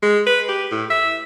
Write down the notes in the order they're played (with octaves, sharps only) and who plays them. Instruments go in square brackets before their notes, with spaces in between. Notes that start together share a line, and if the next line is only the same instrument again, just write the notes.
[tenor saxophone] G#3
B4
G4
A2
E5